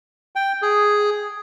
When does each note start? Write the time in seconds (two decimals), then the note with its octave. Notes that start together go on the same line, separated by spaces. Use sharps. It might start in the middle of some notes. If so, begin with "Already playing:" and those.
0.36 G5
0.62 G#4